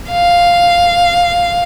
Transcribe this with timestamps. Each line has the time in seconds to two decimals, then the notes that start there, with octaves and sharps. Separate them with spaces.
0.10 F5